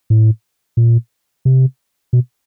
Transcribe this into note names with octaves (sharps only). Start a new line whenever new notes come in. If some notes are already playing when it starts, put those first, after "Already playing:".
A2
A#2
C3
B2